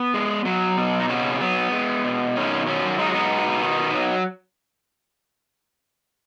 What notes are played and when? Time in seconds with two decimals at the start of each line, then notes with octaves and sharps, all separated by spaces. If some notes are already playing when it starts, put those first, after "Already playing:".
Already playing: B3
0.14 G#3
0.45 F#3
0.77 B2
1.00 D#4
1.09 C#3 C#4 F#4
1.40 F#3 B3
1.72 G#3
2.04 B2
2.36 D#3 C#4
2.67 F#3 C#4
2.99 G#3 D#4
3.06 F#4
3.14 B3 D#4
3.31 B2
3.62 D#3
3.94 F#3